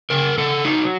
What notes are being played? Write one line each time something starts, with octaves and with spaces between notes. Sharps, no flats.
C#3 A#4
C#3 A4
F#3 D#4